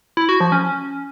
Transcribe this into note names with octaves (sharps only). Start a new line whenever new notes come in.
E4
F#4
F3
C#4